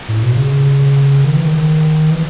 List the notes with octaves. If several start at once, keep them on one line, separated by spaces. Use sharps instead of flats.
A2
B2
C#3
D#3
E3
D#3
E3